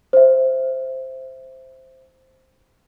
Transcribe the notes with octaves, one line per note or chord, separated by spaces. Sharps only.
C5 E5